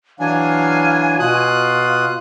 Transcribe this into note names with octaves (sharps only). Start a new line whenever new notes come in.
E3 F#3 D4 F5 G#5
B2 F4 D#6 F#6